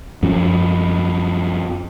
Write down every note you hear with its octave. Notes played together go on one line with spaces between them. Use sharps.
F#2 F3